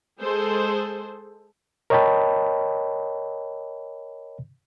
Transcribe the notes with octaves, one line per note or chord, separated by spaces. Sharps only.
G#3 G#4 A4 C5
A#4 C#5 D#5 G5 A5 B5